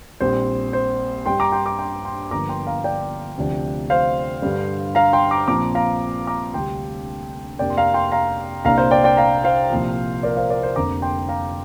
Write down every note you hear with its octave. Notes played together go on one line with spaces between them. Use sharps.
A#1 A#2 G3 C4 C5
C5
G2 G3 D4 G5 C6
A#5 D6
G5 C6
A#5 D6
G5 C6
G5 C6
G1 G2 F3 A#3 A#5 D6
G5 C6
F5 A#5
D5 G5
D2 C3 F3 D4
C5 F5
G2 D3 G3
F5 A#5
G5 C6
A#5 D6
A#1 A#2 F3 C4 A#5 D6
F5 A#5
A#5 D6
D2 C3 G3 G5 C6
F2 C3 A#3 D4 D5 G5
C6
F5 A#5
G5 C6
F5 A#5
C2 A#2 A#3 D4 F5 A#5
C5 F5
D5 G5
D5 G5
F5 A#5
C5 F5
C2 A#2 F3
A#4 D5
C5 F5
A#4 D5
C5
F1 F2 D3 A#3 A#5 D6
G5 C6
F5 A#5